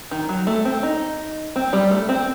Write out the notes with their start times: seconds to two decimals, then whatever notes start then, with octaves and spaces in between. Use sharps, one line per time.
0.11 D#3
0.29 F#3
0.47 A3
0.65 C4
0.83 D#4
1.56 C4
1.73 G3
1.91 A3
2.09 C4